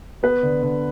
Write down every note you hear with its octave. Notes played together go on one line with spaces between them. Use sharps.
B3 B4
D3
D3